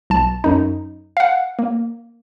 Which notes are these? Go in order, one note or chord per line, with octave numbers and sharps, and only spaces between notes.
B1 A5
F#2 D#4
F5 F#5
A#3